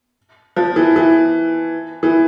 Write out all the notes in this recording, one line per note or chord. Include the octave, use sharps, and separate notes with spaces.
F3
E3
E3
E3